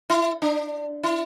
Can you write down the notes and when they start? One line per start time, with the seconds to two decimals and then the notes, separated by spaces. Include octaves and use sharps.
0.10 E4
0.42 D4
1.03 E4